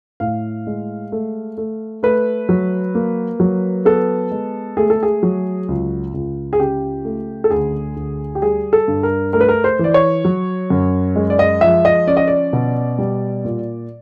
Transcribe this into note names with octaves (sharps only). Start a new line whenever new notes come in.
A2 F5
G#3
A3
A3
A3 B4
F#3
A#3
F#3
B3 A4
G#3
A3 G#4
A4
G#4
F#3
C#2
C#2
G#4
C#3 G4
A3
A4
D2 G#4
D2
G4
G3 G#4
A4
G2
A#4
A3 A#4
B4
A#4
C5
E3 D5
C#5
F#3
F#2
G#3
D5
D#5
F3 E5
D#5
C#4 D5
D#5
D5
B2
G3
A#2